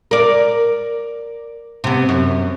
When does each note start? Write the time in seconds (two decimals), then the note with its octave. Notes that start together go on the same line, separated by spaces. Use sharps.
0.11 A#4 D5
1.84 C3 B3
2.09 F#2